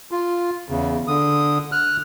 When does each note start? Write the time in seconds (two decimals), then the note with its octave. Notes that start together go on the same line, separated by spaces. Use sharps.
0.11 F4
0.69 E2 C#3
1.08 D3 D#6
1.72 F6 F#6